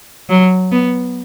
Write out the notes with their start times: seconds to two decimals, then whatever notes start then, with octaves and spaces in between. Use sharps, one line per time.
0.30 F#3
0.72 B3